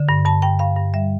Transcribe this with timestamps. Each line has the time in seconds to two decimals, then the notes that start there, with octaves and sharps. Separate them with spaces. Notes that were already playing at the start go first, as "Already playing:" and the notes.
Already playing: D3
0.09 G2
0.25 G2 A5
0.42 G2 G5
0.59 G2 F5
0.77 G2
0.94 G3 E5